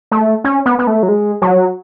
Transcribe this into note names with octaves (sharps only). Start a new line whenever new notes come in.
A3
C#4
B3
B3
A3
F#3
G#3
F#3